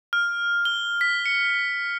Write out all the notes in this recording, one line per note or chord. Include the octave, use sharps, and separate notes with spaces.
F6
G7
B6
C#7